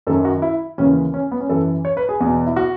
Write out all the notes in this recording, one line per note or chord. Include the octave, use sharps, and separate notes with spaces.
F#2 D#3 A4
F#4
E4
D#2 C#3 E3 C#4
C#4
B3
C#4
F#2 E3 A4
C#5
B4
G#4
E2 B2 G#4
E4
F#4